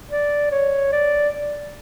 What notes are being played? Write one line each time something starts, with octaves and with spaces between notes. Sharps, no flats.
D5
C#5
D5